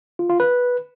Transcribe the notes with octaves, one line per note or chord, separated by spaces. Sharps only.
F4
F4
B4